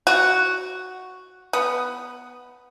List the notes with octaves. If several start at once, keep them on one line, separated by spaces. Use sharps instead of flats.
F#4
B3